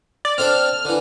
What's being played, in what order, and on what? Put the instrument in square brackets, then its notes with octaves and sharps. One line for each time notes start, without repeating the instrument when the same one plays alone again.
[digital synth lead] D5
[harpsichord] C4 D4 A4 [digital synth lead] F6
[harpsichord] D3 E3